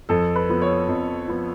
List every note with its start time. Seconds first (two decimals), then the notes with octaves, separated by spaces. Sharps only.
0.09 F2 A4
0.36 B4
0.49 F3 B3
0.62 C#5
0.88 F2
1.28 F3 B3